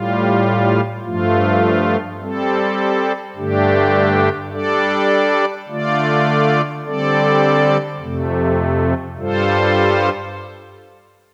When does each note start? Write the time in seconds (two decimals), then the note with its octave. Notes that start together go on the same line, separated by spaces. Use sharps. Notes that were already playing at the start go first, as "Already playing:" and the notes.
Already playing: A2 G3 F4
1.04 G2 F3 A3 F4
2.20 G3 C4 A4
3.36 G2 D3 A3 D4 G4
4.52 G3 D4 A4 D5
5.69 D3 A3 F4 D5
6.85 D3 G3 C4 A4 D5
8.00 F2 C3 A3
9.17 G2 G3 F4 A4 C5